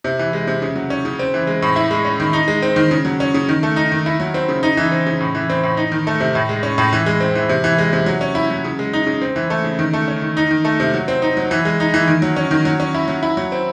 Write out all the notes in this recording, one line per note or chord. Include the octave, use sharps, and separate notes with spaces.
C3
E3
G#3
C3
C#3
F#3
C#4
C#3
C4
E3
G#3
A2
E4
G#3
C#4
D#3
D#4
G#3
C4
D#3
C#3
F#3
C#4
C#3
D#3
A3
D#4
D#3
E4
F#3
C4
C#3
D#4
E3
C4
C#3
A2
E3
C4
A2
D#4
D#3
A3
C3
A2
G#3
C#4
A2
E3
G#3
C4
E3
C3
E3
G#3
C3
F#3
C#4
E4
F#3
C#3
G#3
D#4
C#3
C4
E3
A3
C#3
D#3
A3
C#4
D#3
D#4
D#3
A3
C3
F#3
C4
D#4
F#3
E3
G#3
D#4
E3
D#3
F#3
C#4
D#3
F#3
C#4
E4
F#3
E4
F#3
C4